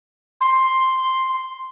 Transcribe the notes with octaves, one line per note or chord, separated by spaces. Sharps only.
C6